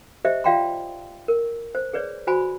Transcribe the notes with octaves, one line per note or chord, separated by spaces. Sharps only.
G4 C5 D#5 E5
F4 D5 F5 G5 A#5 C6
A#4
C5
G#4 B4 C#5 D5
F#4 C5 G#5 B5